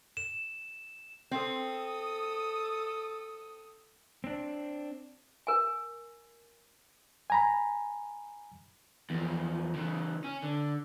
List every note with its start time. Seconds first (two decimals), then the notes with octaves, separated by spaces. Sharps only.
0.17 E7
1.31 C4 A4 D#6
4.24 C4 D4
5.47 A#4 G#5
7.30 G#5 A#5 B5
9.10 E2 F3
9.75 C#3 E3
10.24 C#4
10.43 D3